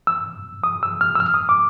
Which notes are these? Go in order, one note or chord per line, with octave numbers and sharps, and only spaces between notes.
E6
D#6
E6
F6
E6
F6
D#6
D6